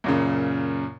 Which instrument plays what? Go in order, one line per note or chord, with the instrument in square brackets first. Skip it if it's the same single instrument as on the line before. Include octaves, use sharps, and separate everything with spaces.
[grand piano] F#2 A#2 C#3